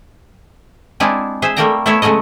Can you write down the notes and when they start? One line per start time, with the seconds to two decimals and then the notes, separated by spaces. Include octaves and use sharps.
1.00 G#3 C4 D4 E4 F4 G#4
1.42 G#4 C5 E5
1.57 G3 A3 A#3 A#4 G5 A#5
1.86 A3 B3 E4 C#5 E5
2.02 C#3 F#3 G#3 A3 D#5